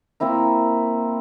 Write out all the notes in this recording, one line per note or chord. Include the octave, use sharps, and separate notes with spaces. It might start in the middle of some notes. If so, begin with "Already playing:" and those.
A#3 C4 E4 A#4